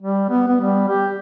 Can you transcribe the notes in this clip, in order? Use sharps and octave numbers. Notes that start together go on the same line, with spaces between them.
G3
B3
B3
G3
G4